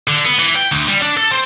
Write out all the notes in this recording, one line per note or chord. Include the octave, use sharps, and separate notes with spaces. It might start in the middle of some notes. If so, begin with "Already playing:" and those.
D3
B3
E3
G5
D2
G3
D4
A4
C4